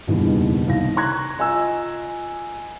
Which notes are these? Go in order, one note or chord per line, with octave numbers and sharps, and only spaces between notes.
F#1 E2 G2 B2 D#3
C2 D#4 F5 A#6
A#5 C6 C#6 F#6 G#6 A#6
F4 D#5 G#5 A#5 E6